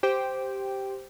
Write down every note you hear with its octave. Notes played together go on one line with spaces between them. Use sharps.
G4 C5 G5